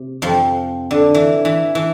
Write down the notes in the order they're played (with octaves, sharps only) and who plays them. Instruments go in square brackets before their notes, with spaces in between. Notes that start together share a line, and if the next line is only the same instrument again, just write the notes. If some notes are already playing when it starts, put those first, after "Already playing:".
Already playing: [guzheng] C3
F2 F3
D3
E3
E3
E3